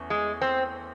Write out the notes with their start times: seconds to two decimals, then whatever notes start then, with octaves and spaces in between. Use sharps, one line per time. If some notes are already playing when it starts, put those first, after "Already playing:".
Already playing: E2 A3 C#4
0.10 G#3
0.41 C4